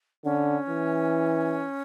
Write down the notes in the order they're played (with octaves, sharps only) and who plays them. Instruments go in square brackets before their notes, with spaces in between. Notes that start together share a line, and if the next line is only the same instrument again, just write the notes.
[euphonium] D3 [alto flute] C#4
[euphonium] E3